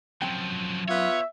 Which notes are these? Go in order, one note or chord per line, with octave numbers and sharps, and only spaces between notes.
F#2 F3 F#3 C4 G5
B3 F4 C#5 E5